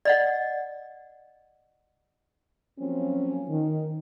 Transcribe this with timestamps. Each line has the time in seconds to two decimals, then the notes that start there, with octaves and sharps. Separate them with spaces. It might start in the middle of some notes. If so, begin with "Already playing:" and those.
0.05 D5 D#5 F#5
2.79 F3 F#3 A#3 C4 C#4
3.49 D#3